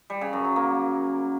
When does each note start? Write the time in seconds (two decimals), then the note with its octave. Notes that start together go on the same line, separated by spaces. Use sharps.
0.10 G3
0.21 C#3
0.33 F#2
0.44 F#3
0.56 A#3